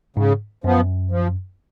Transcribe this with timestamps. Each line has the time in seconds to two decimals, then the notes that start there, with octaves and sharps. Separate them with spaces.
0.17 G#2 C#3
0.64 F#2 F3 B3
1.11 F3